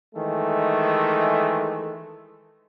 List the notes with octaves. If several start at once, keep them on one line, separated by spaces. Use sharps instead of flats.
D#3 E3 G#3 A3